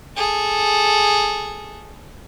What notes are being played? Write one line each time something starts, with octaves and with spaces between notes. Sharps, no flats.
G#4 A4